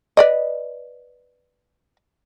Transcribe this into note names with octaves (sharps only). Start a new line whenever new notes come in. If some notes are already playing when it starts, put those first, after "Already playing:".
B4 D5 D#5